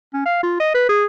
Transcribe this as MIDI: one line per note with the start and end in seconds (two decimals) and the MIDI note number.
0.14 0.22 61
0.26 0.39 77
0.43 0.59 65
0.60 0.72 75
0.75 0.85 71
0.89 1.05 68